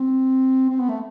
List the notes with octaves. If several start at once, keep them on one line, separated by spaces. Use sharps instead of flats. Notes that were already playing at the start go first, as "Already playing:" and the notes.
Already playing: C4
C4
B3
A3